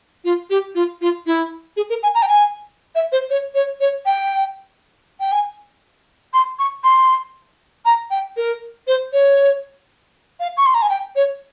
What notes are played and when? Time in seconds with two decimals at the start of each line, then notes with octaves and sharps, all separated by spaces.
0.25 F4
0.50 G4
0.75 F4
1.01 F4
1.26 E4
1.77 G#4
1.90 A#4
2.03 G#5
2.15 A#5
2.23 G5
2.28 G#5
2.95 E5
3.12 C5
3.30 C#5
3.55 C#5
3.80 C#5
4.06 G5
5.20 G5
5.32 G#5
6.34 C6
6.59 C#6
6.84 C6
7.85 A#5
8.11 G5
8.37 A#4
8.87 C5
9.13 C#5
10.40 F5
10.57 C#6
10.66 C6
10.74 A#5
10.82 G#5
10.90 G5
11.16 C#5